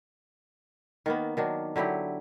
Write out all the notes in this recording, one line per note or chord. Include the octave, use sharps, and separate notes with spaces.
D#3 A#3 B3
D#3 F#3 D4
D3 F#3 E4 G4